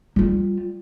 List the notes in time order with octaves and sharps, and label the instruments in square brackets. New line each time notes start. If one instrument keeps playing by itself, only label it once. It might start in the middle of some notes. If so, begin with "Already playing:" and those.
[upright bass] G3 F4